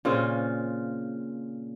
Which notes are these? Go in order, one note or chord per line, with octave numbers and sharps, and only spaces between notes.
A#2 C#3 C4 F4